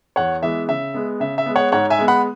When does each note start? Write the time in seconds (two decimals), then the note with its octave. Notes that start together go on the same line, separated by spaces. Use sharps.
0.16 E2 C#5 F#5
0.42 E3 G#3 B3 E5
0.68 C#3 E5
0.94 G#3 B3
1.20 C#3 E5
1.38 E5
1.46 G#3 B3
1.56 C#5 F#5
1.72 G#2 C#5 F#5
1.90 E5 G#5
1.98 G#3 B3
2.08 F#5 B5